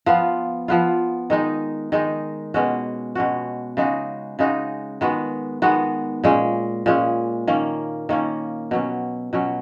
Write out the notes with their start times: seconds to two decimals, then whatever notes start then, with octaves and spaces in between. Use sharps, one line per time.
0.06 F3 B3 F4
0.68 F3 B3 F4
1.30 D#3 G#3 D#4
1.92 D#3 G#3 D#4
2.54 B2 G#3 C#4 F#4
3.15 B2 G#3 C#4 F#4
3.77 C#3 G#3 D#4 F#4
4.39 C#3 G#3 D#4 F#4
5.01 D#3 G#3 B3 F#4
5.62 D#3 G#3 B3 F#4
6.24 A#2 G#3 C#4
6.86 A#2 G#3 C#4
7.47 D#3 A#3 C#4
8.09 D#3 A#3 C#4
8.71 B2 F#3 C#4
9.33 B2 F#3 C#4